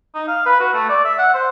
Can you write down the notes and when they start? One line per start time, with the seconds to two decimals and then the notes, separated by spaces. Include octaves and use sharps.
0.15 D#4
0.28 F5
0.46 B4
0.60 F#4
0.73 A3
0.89 D5
1.05 E5
1.19 F#5
1.34 C5